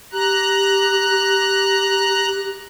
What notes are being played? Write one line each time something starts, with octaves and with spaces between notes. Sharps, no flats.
G4 A#5 F#6